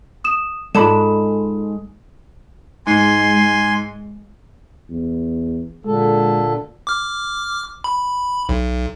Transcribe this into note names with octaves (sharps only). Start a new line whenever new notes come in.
D#6 E7
G#2 G#3 F4 A4 D5 B5 E7
G#2 G#3 G#5 C6
E2
A#2 D3 G#3 A4
D6 F6
B5
B1